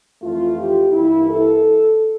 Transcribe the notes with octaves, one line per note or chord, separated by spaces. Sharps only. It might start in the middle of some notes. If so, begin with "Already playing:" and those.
F2 E3 A3 F4
G4
G2 E3 A#3 E4
A4